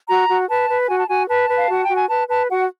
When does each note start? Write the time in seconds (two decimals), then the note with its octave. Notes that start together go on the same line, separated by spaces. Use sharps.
0.08 F#4 A#5
0.29 F#4
0.49 B4 A5
0.69 B4
0.89 F#4 G#5
0.98 A5
1.08 F#4 G#5
1.29 B4 A5
1.49 B4
1.57 F5
1.69 F#4 F#5
1.83 G5
1.89 F#4
1.96 G#5
2.09 B4 A5
2.28 B4 A5
2.49 F#4 F#5